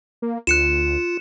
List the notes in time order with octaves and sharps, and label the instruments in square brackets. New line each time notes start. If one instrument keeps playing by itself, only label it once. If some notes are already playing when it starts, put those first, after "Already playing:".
[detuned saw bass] A#3
[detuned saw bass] D2 [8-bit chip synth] F4 [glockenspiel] F#6 C#7 E7